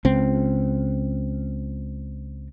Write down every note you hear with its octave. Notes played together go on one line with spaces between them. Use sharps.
C#2 C4